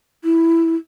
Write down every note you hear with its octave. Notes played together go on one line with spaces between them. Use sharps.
E4